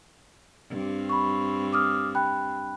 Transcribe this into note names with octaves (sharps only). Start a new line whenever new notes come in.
G2 C4
B5 C#6
D6 D#6 F6
G5 B5 F#6